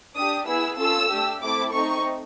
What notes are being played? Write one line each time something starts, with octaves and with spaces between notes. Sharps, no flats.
D4 G4 D#6
B3 E4 G#4 E6
C#4 F4 A4 E6
A3 D4 G4
A3 C4 E4 A4 D6
A3 C4 D#4 C#6